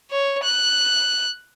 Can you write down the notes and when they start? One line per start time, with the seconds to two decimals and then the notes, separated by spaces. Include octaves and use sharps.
0.11 C#5
0.44 F#6